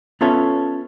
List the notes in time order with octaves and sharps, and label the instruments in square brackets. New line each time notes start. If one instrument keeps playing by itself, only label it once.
[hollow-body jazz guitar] B3 C#4 F4 A4 C#5 E5